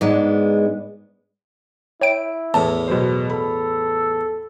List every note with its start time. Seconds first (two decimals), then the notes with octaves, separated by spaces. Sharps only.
0.01 G#2 G#3 B3 D4
2.01 E4 C#5 G5 D7
2.54 E2 A2 A5
2.88 B2 F#3 C5
3.30 A4 B5